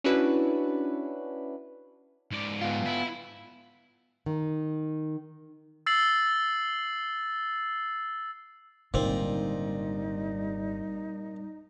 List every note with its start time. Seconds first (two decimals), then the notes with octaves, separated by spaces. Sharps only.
0.04 C#4 D4 E4 F#4 B4
2.31 G#2 D5
2.61 B3 F4
2.86 E4
4.26 D#3
5.86 E6 A6 C7 F#7
8.94 G#1 A#2 D3 G3 C4 D#4